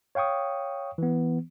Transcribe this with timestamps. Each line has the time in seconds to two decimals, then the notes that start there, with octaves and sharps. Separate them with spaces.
0.15 C#5 F5 G5 C#6 D#6
0.98 E3 B3